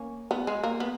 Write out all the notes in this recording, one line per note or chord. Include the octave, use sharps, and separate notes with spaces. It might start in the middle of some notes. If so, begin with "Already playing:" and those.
Already playing: A#3 C#4
B3
G#3
A#3
B3